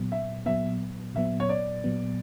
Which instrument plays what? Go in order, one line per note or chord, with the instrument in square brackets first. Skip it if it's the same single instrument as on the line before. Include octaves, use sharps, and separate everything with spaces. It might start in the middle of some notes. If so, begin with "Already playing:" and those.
Already playing: [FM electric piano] A#2 F#3 B3
[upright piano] E5
[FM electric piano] A#2 F#3 B3 [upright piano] E5
[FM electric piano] A#2 F#3 B3 [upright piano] E5
[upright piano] C#5
D5
[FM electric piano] A#2 F#3 B3